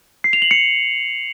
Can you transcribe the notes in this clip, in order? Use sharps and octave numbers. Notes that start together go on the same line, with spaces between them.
C7
F7
F#7
C#7